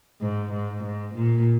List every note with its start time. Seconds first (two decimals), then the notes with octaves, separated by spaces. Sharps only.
0.21 G#2
0.52 G#2
0.84 G#2
1.14 A#2